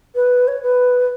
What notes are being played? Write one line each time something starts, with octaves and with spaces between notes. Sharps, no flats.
B4
C#5
B4